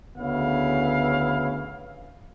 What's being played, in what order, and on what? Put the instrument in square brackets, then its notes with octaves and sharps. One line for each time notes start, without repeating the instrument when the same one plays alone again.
[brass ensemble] D2 C#3 B3 E4 F5